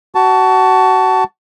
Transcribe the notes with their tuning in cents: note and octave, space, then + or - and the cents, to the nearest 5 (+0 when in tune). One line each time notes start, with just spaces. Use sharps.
F#4 +25 A5 +0